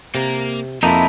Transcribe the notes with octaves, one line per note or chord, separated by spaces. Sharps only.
C3 A#3 A#4
F2 C3 A#3 D#4 E4 A5